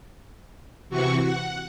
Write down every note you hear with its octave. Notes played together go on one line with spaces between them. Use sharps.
C3 E3 F#4 C#6
F#5